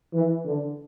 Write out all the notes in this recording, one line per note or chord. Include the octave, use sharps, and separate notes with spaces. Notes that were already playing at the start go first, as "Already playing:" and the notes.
E3
D3